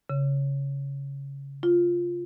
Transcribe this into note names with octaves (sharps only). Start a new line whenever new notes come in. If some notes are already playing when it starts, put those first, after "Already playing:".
C#3
F4